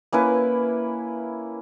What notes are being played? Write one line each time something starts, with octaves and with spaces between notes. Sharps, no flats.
A#3 C#4 E4 B4